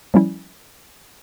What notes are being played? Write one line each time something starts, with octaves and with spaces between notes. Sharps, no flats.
F3 G3 C#4 E4